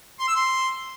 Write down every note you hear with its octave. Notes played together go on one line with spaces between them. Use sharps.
C6
E6
C6